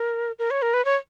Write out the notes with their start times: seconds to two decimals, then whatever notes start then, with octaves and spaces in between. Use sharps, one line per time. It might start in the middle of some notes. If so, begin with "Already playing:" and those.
Already playing: A#4
0.39 A#4
0.51 C#5
0.62 A#4
0.74 B4
0.85 C#5